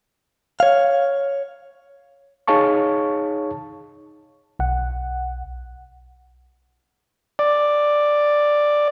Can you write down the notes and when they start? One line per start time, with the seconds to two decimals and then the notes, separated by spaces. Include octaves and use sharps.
0.60 C#5 F5
2.48 D#4 G#4 C#5 F5 A5 C#6
4.59 B1 F#5
7.39 D5